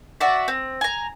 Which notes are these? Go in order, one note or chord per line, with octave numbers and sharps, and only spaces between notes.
F#4 D5 E5
C4
G#5 A#5